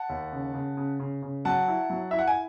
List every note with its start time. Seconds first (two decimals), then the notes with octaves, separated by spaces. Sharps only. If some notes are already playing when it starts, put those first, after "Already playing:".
Already playing: F#5 A5
0.09 D#2
0.32 C#3
0.54 C#3
0.77 C#3
1.00 C#3
1.22 C#3
1.45 F#3 F#5 A5
1.68 E4
1.90 F#3
2.11 E4 E5
2.19 F#5
2.27 G#5